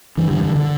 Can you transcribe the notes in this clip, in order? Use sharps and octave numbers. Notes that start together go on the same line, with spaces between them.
G2 E3
D3
D3
D3